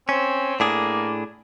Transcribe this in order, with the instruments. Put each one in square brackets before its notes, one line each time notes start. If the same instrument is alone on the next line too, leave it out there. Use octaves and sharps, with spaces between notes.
[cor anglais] C4 [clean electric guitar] C#4
[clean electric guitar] A2 D4 G#4 [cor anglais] A#3